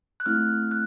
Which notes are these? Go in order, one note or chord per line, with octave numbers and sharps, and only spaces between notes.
F#6
A3 C4 E4 F6
F#6